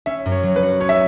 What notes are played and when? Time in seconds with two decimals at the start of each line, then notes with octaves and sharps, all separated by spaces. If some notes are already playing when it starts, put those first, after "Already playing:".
0.06 C#4 E5
0.26 F#2
0.32 C#5
0.43 F#3
0.56 B4
0.63 F#4
0.81 C#4 C#5
0.89 E5